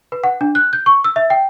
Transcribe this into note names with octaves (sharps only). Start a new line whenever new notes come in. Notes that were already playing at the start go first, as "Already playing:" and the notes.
B4
F#5
D4
F#6
G6
C#6
E6
E5
G5